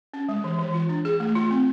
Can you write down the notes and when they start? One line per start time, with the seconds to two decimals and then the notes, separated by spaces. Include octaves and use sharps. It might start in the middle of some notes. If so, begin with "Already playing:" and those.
0.14 C#4
0.29 G#3
0.44 E3
0.59 E3
0.74 F4
0.89 D4
1.05 G#4
1.20 A3
1.35 F4
1.51 C4